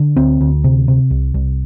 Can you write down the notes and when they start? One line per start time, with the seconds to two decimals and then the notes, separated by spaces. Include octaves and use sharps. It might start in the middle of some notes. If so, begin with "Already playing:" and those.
Already playing: D3
0.17 D2 C4
0.41 D2
0.64 C3
0.88 C3
1.11 C2
1.34 C2